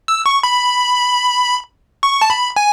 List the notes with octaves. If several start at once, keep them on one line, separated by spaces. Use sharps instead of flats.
E6
C#6
B5
C#6
A5
B5
G#5